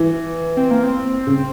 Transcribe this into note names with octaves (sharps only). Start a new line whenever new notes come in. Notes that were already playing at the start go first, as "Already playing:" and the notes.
Already playing: E3
C4
A#3
C4
C#3